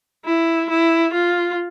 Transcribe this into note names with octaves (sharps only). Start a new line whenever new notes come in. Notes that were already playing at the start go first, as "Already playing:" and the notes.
E4
E4
F4